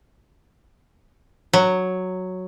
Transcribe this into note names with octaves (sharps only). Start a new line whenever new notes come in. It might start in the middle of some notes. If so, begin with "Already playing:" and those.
F#3